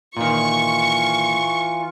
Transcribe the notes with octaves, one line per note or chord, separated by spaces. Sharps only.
A#2 D#3 E3 F4 C#6